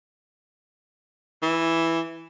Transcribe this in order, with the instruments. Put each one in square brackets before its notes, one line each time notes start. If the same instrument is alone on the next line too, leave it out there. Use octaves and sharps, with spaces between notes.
[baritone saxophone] E3